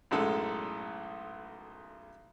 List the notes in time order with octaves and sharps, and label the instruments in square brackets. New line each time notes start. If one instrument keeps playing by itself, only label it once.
[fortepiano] B1 F#2 A2 G#3 A4